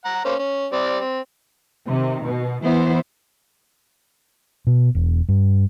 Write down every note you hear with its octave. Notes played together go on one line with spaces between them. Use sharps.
F#5 A#5
A#3 C#4 C5
C#4
G3 C4 D5
C4
C3 D#3
B2
E3 B3 E4 C5
B2
E1
G2